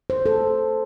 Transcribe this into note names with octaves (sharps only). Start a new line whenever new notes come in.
C5
A4